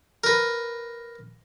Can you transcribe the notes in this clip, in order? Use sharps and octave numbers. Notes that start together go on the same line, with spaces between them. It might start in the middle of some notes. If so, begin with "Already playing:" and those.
A#4 B4